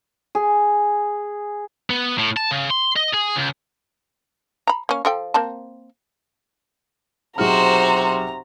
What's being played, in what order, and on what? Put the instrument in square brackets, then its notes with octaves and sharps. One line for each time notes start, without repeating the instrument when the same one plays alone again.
[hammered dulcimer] G#4
[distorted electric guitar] B3
A2
A5
C#3
C6
D#5
G#4
C#2
[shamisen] A#5 B5
A#3 C#4
F3 A4 G5
A#3 C4 A5
[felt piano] B1 G#4 F6 [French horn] C3 [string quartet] F#4 C5 [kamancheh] A#5